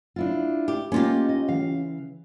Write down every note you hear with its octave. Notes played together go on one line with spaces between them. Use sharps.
D4 E4 F4
G4
A#3 C#4 D#4 F4 G4
D#5
C#3 E3 F5